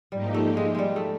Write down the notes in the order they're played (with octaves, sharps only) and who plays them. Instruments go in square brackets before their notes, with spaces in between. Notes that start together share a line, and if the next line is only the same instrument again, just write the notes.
[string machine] G#2 F3 A#3 D#4 G4 [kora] G3
[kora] A3
G#3
G3 G#3
A3